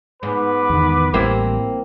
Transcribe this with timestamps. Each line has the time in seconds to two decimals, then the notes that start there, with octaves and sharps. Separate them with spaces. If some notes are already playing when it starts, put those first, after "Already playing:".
0.23 G#2 B3 B4 D6
0.70 E2 D#3
1.14 A1 G3 A#3 C4 E4